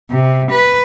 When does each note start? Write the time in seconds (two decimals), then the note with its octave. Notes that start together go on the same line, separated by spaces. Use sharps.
0.11 C3
0.51 B4